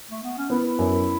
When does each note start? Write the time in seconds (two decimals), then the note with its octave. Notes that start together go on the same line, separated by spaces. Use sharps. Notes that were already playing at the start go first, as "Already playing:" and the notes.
0.10 A3
0.23 B3
0.37 C#4
0.50 B3 E4
0.79 F#2